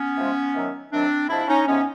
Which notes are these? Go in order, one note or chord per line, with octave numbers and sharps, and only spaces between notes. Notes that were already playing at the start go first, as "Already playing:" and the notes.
Already playing: B3 C#4
C3 F3 G#3
C3 D#3 F#3
C3 D#3 F#3 C4 D4
C3 F3 G#3 D4 E4
C#4 D#4
C3 F3 G#3 B3 C#4